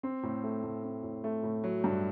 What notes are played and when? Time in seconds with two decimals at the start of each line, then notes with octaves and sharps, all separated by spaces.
0.03 C4
0.23 A2
0.43 A3
0.63 A2
0.84 C4
1.03 A2
1.24 A3
1.43 A2
1.63 F#3
1.84 G2